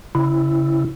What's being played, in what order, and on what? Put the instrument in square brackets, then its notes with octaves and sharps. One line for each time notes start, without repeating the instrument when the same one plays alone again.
[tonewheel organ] C#3 E4